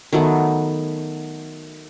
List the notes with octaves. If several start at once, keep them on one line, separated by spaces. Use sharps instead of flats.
D#3 F#3 A3 B3